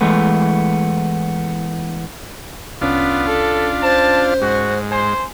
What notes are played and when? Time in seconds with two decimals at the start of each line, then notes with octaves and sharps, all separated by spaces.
0.01 E3 G#3 A3 B3
2.81 C2 B3 C#4 D4 F4 B6
3.27 A4
3.82 C5 A5
4.42 G#2 F#4
4.92 C5 G#5